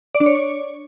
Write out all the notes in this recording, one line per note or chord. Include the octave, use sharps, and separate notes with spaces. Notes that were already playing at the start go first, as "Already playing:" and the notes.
D5
D4
C#5